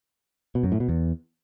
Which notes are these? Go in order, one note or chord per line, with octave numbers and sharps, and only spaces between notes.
B2
F#2
A2
B2
E2